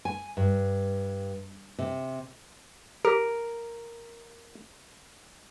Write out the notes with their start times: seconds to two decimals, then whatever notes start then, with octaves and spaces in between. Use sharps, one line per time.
0.05 G#5
0.37 G2
1.79 C3
3.05 G4 A#4